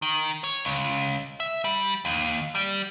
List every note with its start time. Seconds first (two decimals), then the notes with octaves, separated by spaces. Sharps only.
0.02 D#3
0.44 C#5
0.65 C#2
1.40 E5
1.65 G3
2.05 D#2
2.55 G3